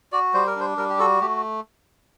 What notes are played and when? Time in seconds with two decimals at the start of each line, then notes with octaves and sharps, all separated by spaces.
0.12 F#4 D5
0.34 G3 C5
0.47 A#4
0.56 D4 C5
0.78 G3 A#4
0.90 G4
0.99 F#4 A4
1.21 A3 G4